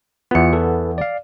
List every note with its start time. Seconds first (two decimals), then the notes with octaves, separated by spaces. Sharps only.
0.31 E2 B3 F4 C#7
0.53 E3 A4 B4
0.98 D5 F5